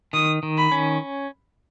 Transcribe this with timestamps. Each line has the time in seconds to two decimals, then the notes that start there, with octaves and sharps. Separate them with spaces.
0.13 D#3 D#6
0.43 D#3
0.58 B5
0.72 C#4